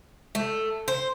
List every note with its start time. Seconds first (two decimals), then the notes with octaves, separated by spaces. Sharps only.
0.35 G#3 A3
0.88 C5